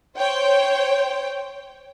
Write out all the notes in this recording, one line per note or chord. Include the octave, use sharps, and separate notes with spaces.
C5 C#5 G5